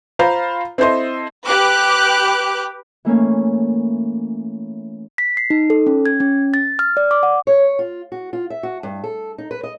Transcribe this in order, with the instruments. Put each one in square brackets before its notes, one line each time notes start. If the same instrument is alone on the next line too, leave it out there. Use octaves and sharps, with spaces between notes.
[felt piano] F4 C5 F5 A#5 B5
C4 E4 A4 C5 D#5 C6
[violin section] G4 B4 D6 F#6
[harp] E3 A3 A#3 C#4
[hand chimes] B6
C7
D#4
A4
C#4
G#6
C#4
A6
F6
D5
D6
F#5
[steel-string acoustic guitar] C#5
F4
F#4
F4
E5
F#4
G2
A4
D#4
B4
D#5